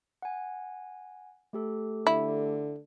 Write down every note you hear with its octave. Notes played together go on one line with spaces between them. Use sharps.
F#5 G#5
A3 G4 A4
D3 E4